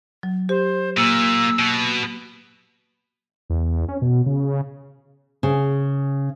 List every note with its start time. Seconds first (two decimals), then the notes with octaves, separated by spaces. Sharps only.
0.23 F#3
0.49 G4 C5
0.97 A#2 A#3 E6
1.59 B2
3.50 E2
3.88 C#4
4.02 B2
4.26 C#3
5.43 C#3